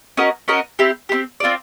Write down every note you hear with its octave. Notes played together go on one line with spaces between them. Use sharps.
C#4 F#4 A#4 D#5
C#4 F#4 A#4 D#5
C4 E4 G4
C4 E4 G4
C4 F4 A4 D5